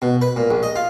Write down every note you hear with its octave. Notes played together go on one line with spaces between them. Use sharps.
B2
B4
A#2
A#1
D#5
F4